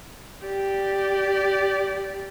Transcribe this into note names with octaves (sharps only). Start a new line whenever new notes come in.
G4 D5